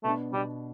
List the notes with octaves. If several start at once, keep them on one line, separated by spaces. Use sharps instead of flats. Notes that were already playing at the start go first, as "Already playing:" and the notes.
B2 A3 B3 D4
B2 G3 B3 D4